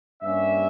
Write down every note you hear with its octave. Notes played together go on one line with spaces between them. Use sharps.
G2 G3 A#3 C#4 E5